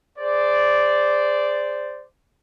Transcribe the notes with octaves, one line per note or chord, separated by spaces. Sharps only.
G#4 C5 D5